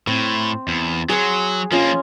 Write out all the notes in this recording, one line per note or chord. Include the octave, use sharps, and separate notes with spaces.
A2 C4
E2
F#3 G#4 F#5 C6
F3 A#3 C#4 F4 D#5